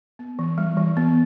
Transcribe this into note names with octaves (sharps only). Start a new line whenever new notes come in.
B3
E3
G3
E3
B3